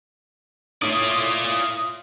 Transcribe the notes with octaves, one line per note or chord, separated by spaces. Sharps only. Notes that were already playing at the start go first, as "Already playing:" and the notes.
A2 F4 C#5 D5 D#6 D7